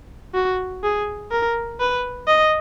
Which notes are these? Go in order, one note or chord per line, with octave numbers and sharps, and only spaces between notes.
F#4
G#4
A#4
B4
D#5